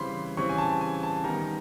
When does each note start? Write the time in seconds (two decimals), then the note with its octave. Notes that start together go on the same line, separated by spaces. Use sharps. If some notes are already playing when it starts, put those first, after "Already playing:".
Already playing: C#3 E3 G3 C4 B5 C6
0.37 C#3 E3 G3 C4 C#6
0.49 G#5
0.58 A5
0.81 G#5
1.03 A5
1.24 D#3 G3 B3 A#5